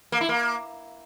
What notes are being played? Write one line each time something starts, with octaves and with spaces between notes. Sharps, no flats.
A#3
E4
A#3